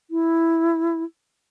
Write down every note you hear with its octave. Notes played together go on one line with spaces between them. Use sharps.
E4